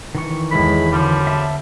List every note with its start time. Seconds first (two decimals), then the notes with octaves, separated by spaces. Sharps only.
0.15 D#3 E3 C#6
0.51 E2 A2 G#3 B5
0.91 F#2 D3 F3 G3
1.27 E5 A5